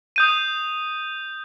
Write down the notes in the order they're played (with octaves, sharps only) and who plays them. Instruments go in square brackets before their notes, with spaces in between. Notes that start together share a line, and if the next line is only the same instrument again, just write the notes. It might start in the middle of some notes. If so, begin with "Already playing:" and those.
[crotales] D#6 G6 D#7